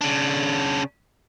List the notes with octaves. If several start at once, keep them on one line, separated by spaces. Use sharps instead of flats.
C#3 D4